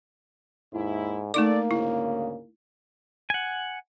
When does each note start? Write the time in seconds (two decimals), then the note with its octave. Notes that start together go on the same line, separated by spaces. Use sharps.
0.73 D#2 G#2 E4
1.34 A3 A#3 D#4 A4 D5 D6
1.71 D2 G#2 C#3 E4
3.30 F#5 G#5